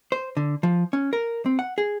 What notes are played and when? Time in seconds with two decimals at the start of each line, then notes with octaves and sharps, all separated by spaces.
0.12 C5
0.37 D3
0.63 F3
0.93 C#4
1.13 A#4
1.46 C4
1.59 F#5
1.78 G#4